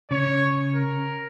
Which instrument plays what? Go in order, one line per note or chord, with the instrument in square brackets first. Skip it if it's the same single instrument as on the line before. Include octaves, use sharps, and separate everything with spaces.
[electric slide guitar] C#3 C#4 [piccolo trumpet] C#5
[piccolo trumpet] A#4